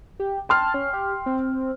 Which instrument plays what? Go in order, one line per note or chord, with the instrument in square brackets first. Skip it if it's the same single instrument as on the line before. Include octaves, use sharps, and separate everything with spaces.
[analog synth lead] G4
[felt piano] G5 C6 F6 [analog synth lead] A5
[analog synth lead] C#4
G4
C4